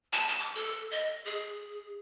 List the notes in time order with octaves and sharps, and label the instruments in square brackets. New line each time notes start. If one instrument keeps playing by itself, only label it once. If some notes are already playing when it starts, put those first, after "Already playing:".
[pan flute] A5
A5
D6
A4
D#5
G#4